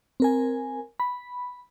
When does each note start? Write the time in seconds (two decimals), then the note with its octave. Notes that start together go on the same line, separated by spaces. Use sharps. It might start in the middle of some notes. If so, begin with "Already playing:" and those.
0.20 C4 A#4 G#5
1.00 B5